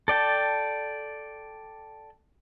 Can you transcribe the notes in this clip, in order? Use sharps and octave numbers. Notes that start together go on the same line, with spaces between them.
A4 D5 G5 A5